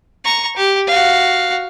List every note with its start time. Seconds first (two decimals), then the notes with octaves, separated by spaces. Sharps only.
0.25 A#5 C#6
0.56 G4
0.87 F#4 F5